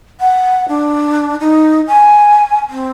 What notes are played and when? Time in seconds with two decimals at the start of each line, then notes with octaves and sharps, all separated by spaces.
0.20 F#5
0.68 D4
1.40 D#4
1.87 G#5
2.70 C4